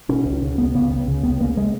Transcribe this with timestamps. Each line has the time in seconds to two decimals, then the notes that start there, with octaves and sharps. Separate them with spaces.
0.09 B2 C#4
0.26 C#2
0.42 C#3
0.58 C#2 B3
0.75 C#3 B3
0.91 C#2
1.08 C#3
1.23 C#2 B3
1.40 C#3 A#3
1.57 G#3